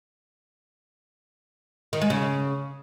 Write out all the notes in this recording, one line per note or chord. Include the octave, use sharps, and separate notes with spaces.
D#3
G#3
C#3